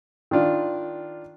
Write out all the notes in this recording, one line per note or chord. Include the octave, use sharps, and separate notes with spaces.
D#3 D4 F4 D5